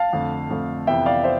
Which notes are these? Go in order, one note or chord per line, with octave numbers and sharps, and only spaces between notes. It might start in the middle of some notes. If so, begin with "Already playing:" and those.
Already playing: F5 A5
F2 D3 A3
F2 D3 A3
F2 C3 E3 B3 E5 G5
D5 F5
C5 E5